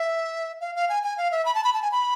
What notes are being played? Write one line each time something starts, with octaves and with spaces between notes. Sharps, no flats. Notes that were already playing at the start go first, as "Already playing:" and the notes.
Already playing: E5
F5
F5
G#5
G#5
F5
E5
B5
A5
B5
A5
G#5
B5